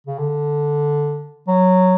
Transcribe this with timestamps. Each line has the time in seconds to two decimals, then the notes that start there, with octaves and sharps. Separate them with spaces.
0.07 C#3
0.18 D3
1.48 F#3